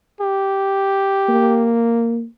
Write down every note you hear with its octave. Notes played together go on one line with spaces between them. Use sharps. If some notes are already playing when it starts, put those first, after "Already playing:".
G4
A#3